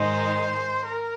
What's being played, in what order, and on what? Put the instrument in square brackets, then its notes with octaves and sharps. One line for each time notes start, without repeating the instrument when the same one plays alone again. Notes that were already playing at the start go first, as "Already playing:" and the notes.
Already playing: [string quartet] G#2 D#3 G#3 D#4 [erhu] C5
[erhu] A#4